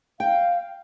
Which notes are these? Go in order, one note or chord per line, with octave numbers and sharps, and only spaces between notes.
F5 G5